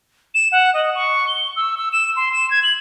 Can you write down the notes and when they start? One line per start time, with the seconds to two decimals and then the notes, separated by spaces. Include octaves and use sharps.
0.34 E7
0.52 F#5
0.74 D#5
0.95 C#6
1.28 G7
1.56 E6
1.77 E6
1.92 E7
2.16 C6
2.33 E7
2.51 G#6
2.63 F#7